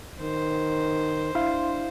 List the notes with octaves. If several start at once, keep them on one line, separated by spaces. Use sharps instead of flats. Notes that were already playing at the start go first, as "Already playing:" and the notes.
D#3 C5
D4 E4 F5 C6